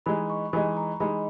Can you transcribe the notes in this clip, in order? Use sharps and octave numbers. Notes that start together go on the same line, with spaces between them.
E3 G#3 D#4 B5
C#6
E3 G#3 D#4 B5
A#5
E3 G#3 D#4 B5